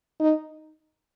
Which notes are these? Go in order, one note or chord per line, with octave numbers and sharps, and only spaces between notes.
D#4